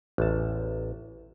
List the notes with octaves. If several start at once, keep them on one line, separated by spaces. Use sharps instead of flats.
A1 E2 A5